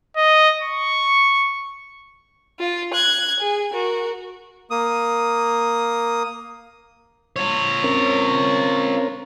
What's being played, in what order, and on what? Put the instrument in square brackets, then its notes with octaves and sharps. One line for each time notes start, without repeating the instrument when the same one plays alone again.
[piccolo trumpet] D#5
C#6
[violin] F4
F#6 G#6
G#4
F#4 A#4
[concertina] A#3 D#6
[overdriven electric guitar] F4 C#5
[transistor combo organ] C4 C#4 A#4